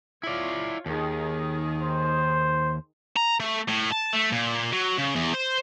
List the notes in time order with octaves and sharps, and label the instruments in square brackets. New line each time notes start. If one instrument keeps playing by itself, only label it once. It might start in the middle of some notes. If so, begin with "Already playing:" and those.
[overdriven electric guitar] E4 D5 [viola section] F4 C#5
[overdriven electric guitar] D#2 [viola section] D#3 D#4 G#4
[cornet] C5
[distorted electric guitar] A#5
A3
A2
A5
A3
A#2
F#3
C#3
E2
C5